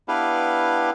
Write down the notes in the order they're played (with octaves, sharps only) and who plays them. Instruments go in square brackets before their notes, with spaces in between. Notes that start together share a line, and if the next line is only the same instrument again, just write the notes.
[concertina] B3 D4 E4 G4 B4 F5